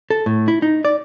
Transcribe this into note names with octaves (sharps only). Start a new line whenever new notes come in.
A4
A2
E4
D#4
D5